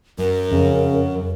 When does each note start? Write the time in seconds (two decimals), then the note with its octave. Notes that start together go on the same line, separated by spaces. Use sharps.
0.18 F#2 A#4
0.52 F2 C#3